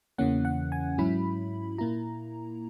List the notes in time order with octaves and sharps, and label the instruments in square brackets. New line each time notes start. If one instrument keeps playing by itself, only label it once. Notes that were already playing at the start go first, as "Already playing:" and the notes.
[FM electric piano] E2 C#3 E3 A#3 C#4 F#5
F#5
G#5
G#2 F#3 C#4 E4 B5
A#2 A#3 E4 A#5